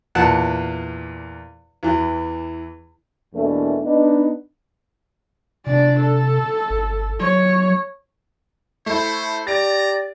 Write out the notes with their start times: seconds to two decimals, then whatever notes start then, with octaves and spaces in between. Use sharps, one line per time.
0.15 E2 A#2 F#5 A5 F#6
1.83 E2 E3
3.33 E2 B2 E3 A3 A#3 D4
3.83 B3 D4 D#4
5.67 C3 D4 D5
6.00 A4
6.70 G1
7.21 F#3 C#5
8.86 A3 E4 C5
9.47 G4 D5 A#5 A6 D7